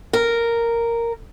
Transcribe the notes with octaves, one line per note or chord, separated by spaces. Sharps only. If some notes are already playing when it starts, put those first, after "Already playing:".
A#4